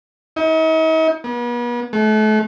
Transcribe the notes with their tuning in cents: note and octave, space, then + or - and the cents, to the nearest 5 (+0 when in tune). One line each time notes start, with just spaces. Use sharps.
D#4 +45
B3 -40
A3 -35